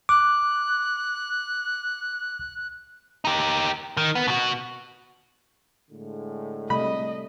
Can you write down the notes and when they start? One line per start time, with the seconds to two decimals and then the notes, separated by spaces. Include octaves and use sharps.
0.09 D6 F#6
3.25 D#4 G4
3.97 D#3
4.15 B3
4.27 B2 F#4
5.91 A2 D3 G#3
6.70 C3 G3 A3 D#5 B5